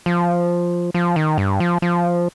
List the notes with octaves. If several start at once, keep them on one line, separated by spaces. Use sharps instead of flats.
F3
F3
D#3
G2
F3
F3